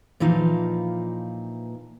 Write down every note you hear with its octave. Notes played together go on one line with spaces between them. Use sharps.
A#2 E3 F3 D#4 F5